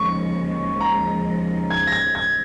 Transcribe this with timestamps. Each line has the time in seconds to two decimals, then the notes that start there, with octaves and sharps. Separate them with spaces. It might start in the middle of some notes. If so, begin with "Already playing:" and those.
Already playing: D#2 C#3 F3 G#3 C#6
0.80 A#5
1.70 G#6
1.87 A#6
1.92 G#6
2.15 G#6